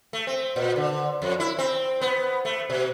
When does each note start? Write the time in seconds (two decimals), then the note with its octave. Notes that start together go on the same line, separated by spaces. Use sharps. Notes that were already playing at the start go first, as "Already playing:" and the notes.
0.13 A3
0.27 C4
0.56 A#2
0.76 D3
1.22 F2
1.40 E4
1.59 C4
2.01 B3
2.45 A3
2.70 B2